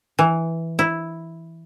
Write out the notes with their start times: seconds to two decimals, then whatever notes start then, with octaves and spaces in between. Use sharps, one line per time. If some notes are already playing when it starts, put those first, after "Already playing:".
0.19 E3
0.79 E4